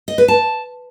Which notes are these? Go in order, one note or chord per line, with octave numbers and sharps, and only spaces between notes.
D#5
B4
A5